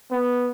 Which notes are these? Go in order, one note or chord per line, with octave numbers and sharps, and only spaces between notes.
B3